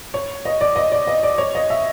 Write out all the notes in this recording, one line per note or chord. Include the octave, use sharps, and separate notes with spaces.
C#5
D#5
D5
D#5
D5
D#5
D5
C#5
D#5
E5